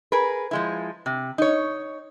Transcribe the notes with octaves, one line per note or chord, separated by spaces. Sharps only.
G#4 A#4 B4
F3 G#3 E4
C3
D#4 C#5